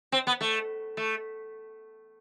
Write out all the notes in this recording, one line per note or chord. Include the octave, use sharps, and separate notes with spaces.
C4
B3
A3
A3